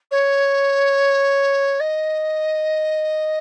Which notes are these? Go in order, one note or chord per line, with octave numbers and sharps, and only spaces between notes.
C#5
D#5